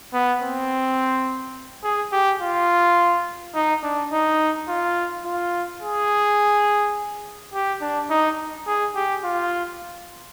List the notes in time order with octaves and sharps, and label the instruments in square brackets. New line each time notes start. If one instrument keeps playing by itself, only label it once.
[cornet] B3
C4
G#4
G4
F4
D#4
D4
D#4
F4
F4
G#4
G4
D4
D#4
G#4
G4
F4